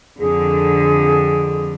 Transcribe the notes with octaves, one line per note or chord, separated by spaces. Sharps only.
F2 D3 G#4